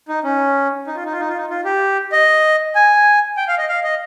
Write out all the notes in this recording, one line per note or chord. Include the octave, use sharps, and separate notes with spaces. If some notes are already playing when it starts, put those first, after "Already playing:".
D#4
C#4
D#4
F4
D#4
F4
D#4
F4
D#4
F4
G4
D#5
G#5
G5
F5
D#5
F5
D#5